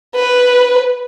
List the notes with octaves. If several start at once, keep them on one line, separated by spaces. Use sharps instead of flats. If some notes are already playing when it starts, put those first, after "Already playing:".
B4